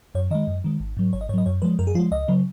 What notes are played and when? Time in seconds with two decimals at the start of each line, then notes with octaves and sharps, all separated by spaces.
0.15 F#2 C#5
0.31 D#3 G#3 D#5
0.47 F#2
0.64 D#3 G#3
0.80 G#1
0.97 G#2 F#3
1.13 G#1 C#5
1.21 D#5
1.29 G#2 C#5
1.34 F#3 D#5
1.46 F#2 C#5
1.62 F3 G#3 B4
1.79 F#2 A#4
1.87 G#4
1.95 F3 F4
1.99 G#3
2.11 C#2 D#5
2.28 C#3 F#3